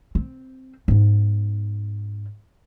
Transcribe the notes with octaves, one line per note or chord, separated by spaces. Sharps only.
C4
G#2 B3